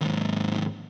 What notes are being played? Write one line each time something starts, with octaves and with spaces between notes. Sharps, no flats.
D#2 G#2